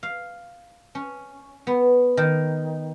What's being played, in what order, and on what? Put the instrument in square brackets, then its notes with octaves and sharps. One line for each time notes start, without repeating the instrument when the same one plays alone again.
[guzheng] F5
C#4
B3
D#3